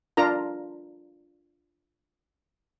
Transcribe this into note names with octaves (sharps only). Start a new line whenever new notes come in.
D4 F4 A#4 A#5